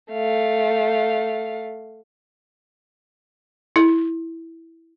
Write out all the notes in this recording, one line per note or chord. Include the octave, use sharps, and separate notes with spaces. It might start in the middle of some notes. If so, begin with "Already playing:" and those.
A3 F5
E4